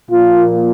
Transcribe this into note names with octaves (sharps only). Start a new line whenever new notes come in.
A#2 F3 A#3 F4